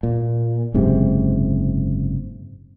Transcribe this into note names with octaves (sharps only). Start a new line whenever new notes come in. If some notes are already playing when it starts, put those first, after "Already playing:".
A#2
F#1 G#2 C3